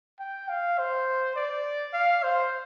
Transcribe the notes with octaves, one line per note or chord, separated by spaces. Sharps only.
G5
F5
C5
D5
F5
C5